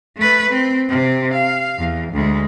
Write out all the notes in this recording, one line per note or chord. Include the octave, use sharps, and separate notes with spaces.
A3 B4
C4
C3 C4
F5
E2
D2 G#3